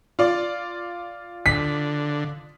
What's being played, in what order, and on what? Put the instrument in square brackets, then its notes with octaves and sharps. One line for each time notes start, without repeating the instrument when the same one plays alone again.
[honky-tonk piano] F4 D5
[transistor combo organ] D3 [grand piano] B6